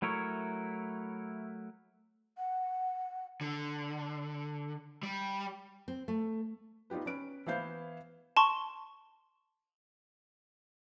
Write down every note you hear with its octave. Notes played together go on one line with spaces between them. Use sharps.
F#3 A3 E4 A#4 C#5
F#5
D3
G3
C4
A3
B3 D#4 F4 G4 B4
C#4 B4 D7
E3 B3 E4 C5 F5 G6
A5 C6 C#6